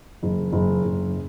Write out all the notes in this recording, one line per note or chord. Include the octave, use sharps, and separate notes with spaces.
F#1
F#1
F#1